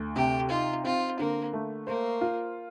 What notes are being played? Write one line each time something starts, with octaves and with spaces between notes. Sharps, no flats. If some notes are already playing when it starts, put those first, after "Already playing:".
Already playing: D2
C3 G4
D#4 F4
C4 F4
D3 A#3
A3
A#3 C5
F4